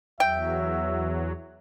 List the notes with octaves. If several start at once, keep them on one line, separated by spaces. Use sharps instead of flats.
E2 F#3 E5 G5